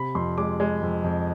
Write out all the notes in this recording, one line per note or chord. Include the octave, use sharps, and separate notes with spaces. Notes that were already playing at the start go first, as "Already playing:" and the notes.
Already playing: C3 B5
F2 C6
G#3 D6
G#3
F2
F2